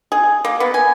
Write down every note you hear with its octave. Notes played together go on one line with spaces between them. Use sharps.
G#4
A#3
B3
G#5